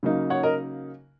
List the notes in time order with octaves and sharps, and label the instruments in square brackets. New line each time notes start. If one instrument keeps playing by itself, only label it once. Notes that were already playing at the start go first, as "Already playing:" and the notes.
[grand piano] C#3 F#3 A#3 D#4
C#5 F#5
A#4 D#5